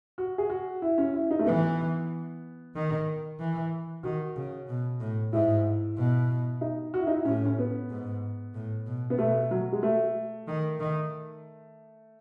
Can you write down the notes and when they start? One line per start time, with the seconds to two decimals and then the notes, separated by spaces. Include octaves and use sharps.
0.18 F#4
0.38 G#4
0.50 F#4
0.82 E4
0.98 C#4
1.13 E4
1.31 D#4
1.39 A3
1.46 E3 B3
2.75 D#3
3.39 E3
4.03 D#3 F#4
4.36 C#3
4.68 B2
5.00 A2
5.33 G#2 E4
5.97 B2
6.61 D#4
6.94 F#4
7.00 E4
7.07 D#4
7.14 E4
7.25 A2 C#4
7.45 C#4
7.59 B3
7.90 G#2
8.55 A2
8.86 B2
9.10 B3
9.18 B2 A3
9.51 F#3
9.72 G#3
9.83 A3
10.48 D#3
10.80 D#3